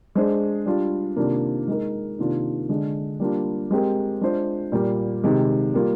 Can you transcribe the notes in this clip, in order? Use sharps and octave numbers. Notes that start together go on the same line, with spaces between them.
G#3 D4 G#4 C5
G3 D4 F4
C3 D#3 A#3 D4 F4
G#3 D#4 A#4
C3 D#3 A#3 D4 F4
D3 G#3 D4
G3 A#3 D4 F4
G#3 C4 G4 A#4
G#3 D4 F4 C5
A#2 G3 A#3
C3 D#3 G#3
G3 A#3 F4